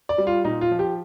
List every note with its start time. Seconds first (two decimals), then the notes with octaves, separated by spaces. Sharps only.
0.09 D5
0.18 G3
0.27 F4
0.45 A#2 D#4
0.61 F4
0.71 F3
0.79 G4